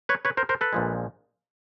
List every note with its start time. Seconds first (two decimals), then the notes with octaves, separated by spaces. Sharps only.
0.09 B4 C#5
0.25 B4 C#5
0.37 A#4 C5
0.49 A#4 C5
0.61 A4 B4
0.73 A#1 A#2 F3 G#3